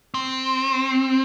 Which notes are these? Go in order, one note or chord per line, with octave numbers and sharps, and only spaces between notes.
C4